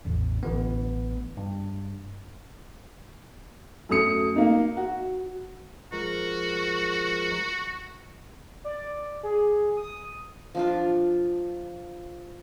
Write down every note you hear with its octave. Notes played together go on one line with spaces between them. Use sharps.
A1 E2 D3
A1 D3 B3
G2
F#2 A3 C#4 D#6 C#7
A#3 D#4
F#4
F3 G#3 F#4 A#4
D5
G#4
D#6
F3 D4 F4